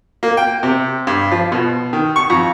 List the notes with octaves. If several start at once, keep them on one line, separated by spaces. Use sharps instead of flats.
A#3
G5
C3
G2
F3
B2
D#3
C#6
F2